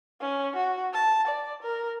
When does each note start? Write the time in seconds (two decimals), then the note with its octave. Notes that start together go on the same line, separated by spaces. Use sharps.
0.21 C#4
0.56 F#4
0.94 A5
1.27 D5
1.62 A#4